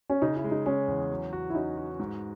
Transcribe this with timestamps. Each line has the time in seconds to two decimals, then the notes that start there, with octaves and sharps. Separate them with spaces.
0.10 C#4
0.22 C#3 D#4
0.36 E4
0.44 G#3
0.51 D#4
0.66 G#3 C#4
0.88 E2
1.10 F#3
1.33 F#4
1.50 E4
1.55 C#4 D#4
1.77 F#4
2.00 G#2